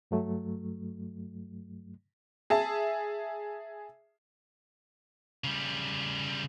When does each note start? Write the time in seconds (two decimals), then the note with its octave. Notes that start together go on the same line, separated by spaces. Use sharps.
0.11 G2 F#3 A3
2.50 G#4 E5 A5
5.44 C#3 G3